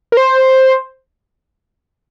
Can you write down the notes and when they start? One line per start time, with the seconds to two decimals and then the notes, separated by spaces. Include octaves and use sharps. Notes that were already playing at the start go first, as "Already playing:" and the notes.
0.12 A#4
0.17 C5